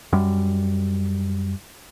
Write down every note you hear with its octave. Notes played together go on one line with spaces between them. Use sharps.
F#2 G3